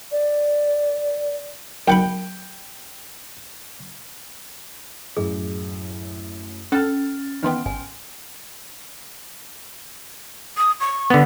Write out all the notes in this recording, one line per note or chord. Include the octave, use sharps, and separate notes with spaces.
D5
F#2 F#5 G5 B5
F#2 A2 G#4
C#4 A4 F6 A6
D#3 E3 B3 G5 C6 F6
G#1 G#5
D#6
C#6
D3 B3